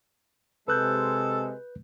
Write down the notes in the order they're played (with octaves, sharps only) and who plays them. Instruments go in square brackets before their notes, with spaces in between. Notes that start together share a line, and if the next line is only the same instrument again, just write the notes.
[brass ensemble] C3 G#3 [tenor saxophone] A4 [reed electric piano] B4 F#6 G6